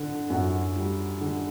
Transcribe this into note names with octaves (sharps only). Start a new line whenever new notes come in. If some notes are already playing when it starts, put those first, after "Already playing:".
Already playing: D3
F#2 F#4
G3
D3